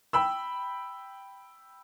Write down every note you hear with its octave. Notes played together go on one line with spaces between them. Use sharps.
G5 B5 E6